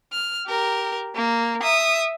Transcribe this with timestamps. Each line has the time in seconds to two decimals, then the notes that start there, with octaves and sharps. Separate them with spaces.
0.12 F6
0.46 G4 A#4
1.15 A#3
1.62 E5 D#6